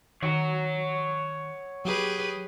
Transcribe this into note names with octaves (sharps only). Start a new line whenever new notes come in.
D#3 C#5 F#5
F#3 G4 G#4 B4